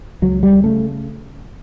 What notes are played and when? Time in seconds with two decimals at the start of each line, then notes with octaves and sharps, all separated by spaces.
0.22 C#2 F#3
0.43 G3
0.64 C#3 A3